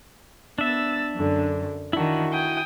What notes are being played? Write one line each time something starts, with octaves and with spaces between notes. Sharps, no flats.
B3 D4 E5 E6 A6
F#2 D3
D#3 D4 E4 F#4
G5 G#5 D#6